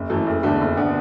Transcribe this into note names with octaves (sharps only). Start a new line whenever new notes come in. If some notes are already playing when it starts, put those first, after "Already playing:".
Already playing: F#1
F#2 E3 A3
F#1
E2 D3 A3
F#1
D3 B3